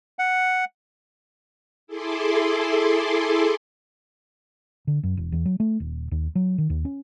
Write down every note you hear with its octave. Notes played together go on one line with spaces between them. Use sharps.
F#5
E4 G#4 A4 C6 D6
D3
F#2
E1
E2
F#3
A3
D#1
D#2
F#3
D#3
D#2
C#4